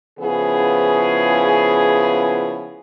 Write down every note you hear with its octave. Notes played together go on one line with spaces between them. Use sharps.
C#3 F3 B3 E4 G#4